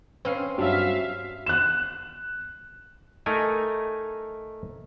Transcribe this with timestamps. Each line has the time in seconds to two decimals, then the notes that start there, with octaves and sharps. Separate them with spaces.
0.25 C4 C#4 B4 F5 C7
0.58 G2 F#3 D4 F#4 C#5 E5 F5
1.46 F#6 E7
3.26 A3 D#4 A#4 G#5